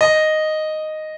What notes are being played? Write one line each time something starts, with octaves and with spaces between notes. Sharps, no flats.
D#5